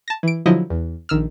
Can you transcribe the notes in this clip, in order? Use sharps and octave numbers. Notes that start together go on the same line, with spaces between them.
A5 A#6
E3 D7
D3 F3 F#3 E4 D#5
E2
A#1 D#3 E6 F6